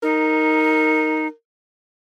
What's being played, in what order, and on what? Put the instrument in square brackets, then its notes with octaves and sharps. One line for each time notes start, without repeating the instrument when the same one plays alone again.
[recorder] D#4 [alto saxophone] A#4